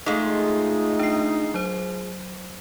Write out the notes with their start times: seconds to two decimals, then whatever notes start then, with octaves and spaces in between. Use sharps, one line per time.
0.06 G#3 A3 D#4 F4 G#4 A4
0.99 D4 C7
1.54 F#3 C5